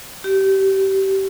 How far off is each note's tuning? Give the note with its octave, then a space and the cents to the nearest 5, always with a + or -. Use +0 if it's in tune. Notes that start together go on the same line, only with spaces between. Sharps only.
G4 -25